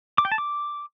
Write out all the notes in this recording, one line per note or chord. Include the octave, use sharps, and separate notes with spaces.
D6
G5
A5
D6